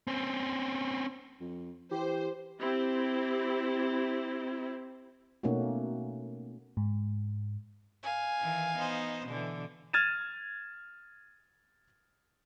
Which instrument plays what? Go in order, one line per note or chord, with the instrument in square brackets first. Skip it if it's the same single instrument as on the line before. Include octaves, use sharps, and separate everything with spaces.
[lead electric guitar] C4 C#4
[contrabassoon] F2
[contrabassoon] E3 [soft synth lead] G4 [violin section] C5
[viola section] C4 E4 G4
[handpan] B2 A3 A#3 C#4 D#4 F#4
[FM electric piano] G#2
[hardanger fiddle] F5 G#5
[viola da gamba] D#3 E3
B3 D#4 C5
B2 D3 E3
[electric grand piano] F6 G#6 A6 D#7 E7